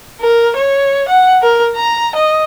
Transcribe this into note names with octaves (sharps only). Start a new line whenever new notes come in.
A#4
C#5
F#5
A#4
A#5
D#5